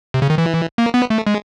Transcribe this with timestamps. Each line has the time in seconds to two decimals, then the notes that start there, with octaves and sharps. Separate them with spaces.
0.14 C3
0.22 C#3
0.30 D#3
0.38 E3
0.78 A#3
0.94 B3
1.10 A3
1.27 G#3